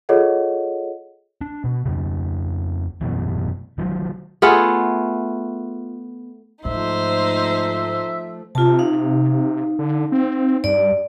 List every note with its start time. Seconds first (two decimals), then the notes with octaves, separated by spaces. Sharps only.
0.09 F4 G#4 A4 C#5 D#5 F#5
1.41 D4
1.64 B2
1.86 F2 C#3
3.01 F#2 B2 E3
3.78 D#3 F3 F#3
4.42 A3 B3 F4 G#4
6.65 G#2 F3 A3 D#4 C5 E5
8.55 C3 F4 A5
8.79 D#4 F5
9.79 D3
10.12 C4
10.64 G2 D5